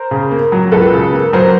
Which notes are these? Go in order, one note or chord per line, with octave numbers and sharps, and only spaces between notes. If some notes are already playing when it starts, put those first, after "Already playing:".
Already playing: A#4 C5
C#3
A#3
F#3
C#2 A4 B4
C#3
A#3
F#3 A#4 C5